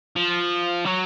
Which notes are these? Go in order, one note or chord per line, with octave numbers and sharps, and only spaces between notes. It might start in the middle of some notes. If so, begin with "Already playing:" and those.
F3
F#3